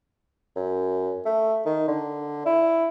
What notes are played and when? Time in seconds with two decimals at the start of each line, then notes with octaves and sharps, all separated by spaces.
0.56 F#2
1.26 A3
1.65 D#3
1.88 D3
2.46 E4